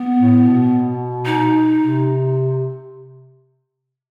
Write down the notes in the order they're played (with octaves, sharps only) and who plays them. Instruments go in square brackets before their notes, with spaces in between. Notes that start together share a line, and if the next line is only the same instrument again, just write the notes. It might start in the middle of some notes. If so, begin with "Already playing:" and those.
Already playing: [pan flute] B3
[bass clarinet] A2
B2
[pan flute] D#4
[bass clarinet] C3